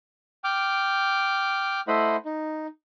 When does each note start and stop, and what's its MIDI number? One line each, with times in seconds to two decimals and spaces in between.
0.44 1.81 79
0.44 1.81 86
0.44 1.81 89
1.88 2.16 57
1.88 2.16 64
1.88 2.16 72
1.88 2.16 75
1.88 2.16 78
1.88 2.16 83
2.25 2.67 63